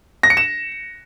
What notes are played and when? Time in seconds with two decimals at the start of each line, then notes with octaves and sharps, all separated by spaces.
0.23 A#6
0.30 C#7
0.37 E7